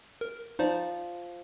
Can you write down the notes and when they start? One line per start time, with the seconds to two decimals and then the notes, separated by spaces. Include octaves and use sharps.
0.21 A#4
0.59 F3 D#4 C5 D5